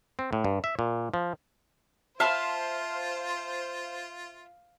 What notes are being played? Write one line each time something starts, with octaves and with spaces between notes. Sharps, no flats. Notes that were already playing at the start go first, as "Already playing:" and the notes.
C4
A2
G2
E5
A#2
F3
F4 C5 E5 F5 A5 C6